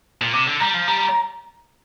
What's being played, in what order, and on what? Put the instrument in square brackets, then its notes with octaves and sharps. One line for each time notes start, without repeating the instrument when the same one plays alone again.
[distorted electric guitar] A#2
[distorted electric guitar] C3 [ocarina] D6
[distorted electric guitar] D3
[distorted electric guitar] G3 [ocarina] A#5
[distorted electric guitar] F3
[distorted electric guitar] G3 [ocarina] A#5